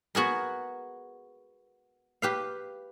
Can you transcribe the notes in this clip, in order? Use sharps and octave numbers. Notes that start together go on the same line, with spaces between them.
B3 F#4 G#4 A#4
G4 B4 F5